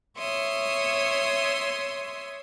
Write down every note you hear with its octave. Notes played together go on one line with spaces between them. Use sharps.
C#5 E5 C6 D#6